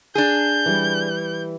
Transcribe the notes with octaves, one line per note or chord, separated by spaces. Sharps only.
D4 G#4 G6
E3 G3